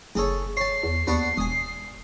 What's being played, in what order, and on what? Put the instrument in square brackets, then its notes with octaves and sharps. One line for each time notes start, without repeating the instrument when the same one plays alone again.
[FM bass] F#1 [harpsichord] G#4 A4 C#5
[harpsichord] C#5 A5 [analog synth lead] C7
[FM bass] E2
[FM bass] D#2 [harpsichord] B3 D4 C#6
[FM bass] E1 [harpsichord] G#5 D#6